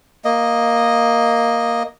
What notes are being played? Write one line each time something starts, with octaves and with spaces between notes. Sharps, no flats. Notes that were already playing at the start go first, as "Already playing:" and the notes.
A#3 D#5